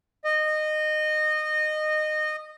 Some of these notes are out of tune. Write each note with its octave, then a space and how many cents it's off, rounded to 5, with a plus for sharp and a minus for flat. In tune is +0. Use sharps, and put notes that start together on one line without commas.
D#5 -20